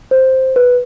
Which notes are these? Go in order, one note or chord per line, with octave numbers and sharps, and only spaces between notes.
C5
B4